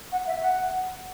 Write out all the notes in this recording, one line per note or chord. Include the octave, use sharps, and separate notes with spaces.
F#5
E5
F#5